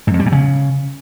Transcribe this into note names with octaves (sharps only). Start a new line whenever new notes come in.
G#2
F2
G3
A#2
C#3